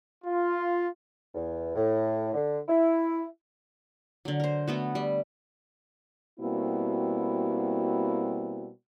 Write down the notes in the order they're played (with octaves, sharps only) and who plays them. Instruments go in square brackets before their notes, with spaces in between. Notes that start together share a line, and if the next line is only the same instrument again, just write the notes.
[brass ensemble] F4
[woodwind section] E2
A2
D3
E4
[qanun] D3 F#3
A#4 C5
A3 B3 F#4
G3
[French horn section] B2 G3 A#3 C4 E4 F#4